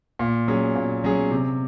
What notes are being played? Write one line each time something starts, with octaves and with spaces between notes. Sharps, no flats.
A#2
F#3 C#4 G#4
A#2
F#3 C#4 G#4
C3